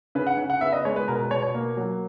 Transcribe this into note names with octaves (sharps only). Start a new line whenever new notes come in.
C#3 B4
F#5
C#3
F#5
B3 E5
D#5
G#3 C#5
B4
B2 A#4
B4
B2 C#5
C#5
A#3
F#3